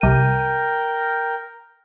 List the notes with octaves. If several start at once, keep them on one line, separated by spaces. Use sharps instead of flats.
C2 A#4 G5 D#7